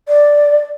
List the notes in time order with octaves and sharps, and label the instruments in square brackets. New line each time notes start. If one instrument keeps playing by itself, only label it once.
[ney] D5